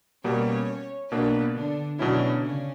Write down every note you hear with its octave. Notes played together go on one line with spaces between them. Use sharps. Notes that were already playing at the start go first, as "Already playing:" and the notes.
B2 G3 A#3 C#4 C#5
B2 A#3 B3 D4 B4
D3 D4
B2 D3 F#3 C#4 D4 E4
C#3 C#4